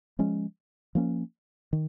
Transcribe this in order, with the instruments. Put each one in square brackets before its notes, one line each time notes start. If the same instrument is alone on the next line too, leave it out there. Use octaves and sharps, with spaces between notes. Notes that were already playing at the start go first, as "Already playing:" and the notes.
[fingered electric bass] F3 G#3 C#4
F3 A#3 C#4
D#3